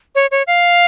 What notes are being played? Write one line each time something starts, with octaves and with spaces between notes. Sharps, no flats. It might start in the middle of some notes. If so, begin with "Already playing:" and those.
C#5
C#5
F5